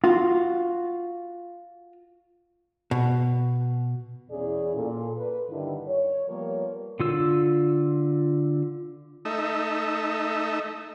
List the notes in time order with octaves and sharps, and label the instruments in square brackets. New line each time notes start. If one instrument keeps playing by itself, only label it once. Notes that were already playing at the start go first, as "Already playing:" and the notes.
[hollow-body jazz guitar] F4 F#4
B2
[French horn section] E2 E3 C#4 E4 G#4 D5
A#2 A4
B4
G2 D3 D#3 G3 E4
C#5
F3 G3 A#3 B3 A#4 C#5
[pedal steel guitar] D3 F4 E6
[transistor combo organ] A3 D#4 E5